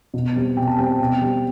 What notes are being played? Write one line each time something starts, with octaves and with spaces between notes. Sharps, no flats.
B2
G3 C4
B2 G5
A5
G3 C4 G5
B2
G3 C4